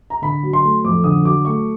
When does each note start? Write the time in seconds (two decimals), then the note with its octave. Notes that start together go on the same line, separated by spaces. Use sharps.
0.10 A#5
0.22 D3 B5
0.43 F#3
0.53 C6
0.63 A3
0.85 F2 D6
1.04 D3 D#6
1.24 F#3 D6
1.45 A3 C#6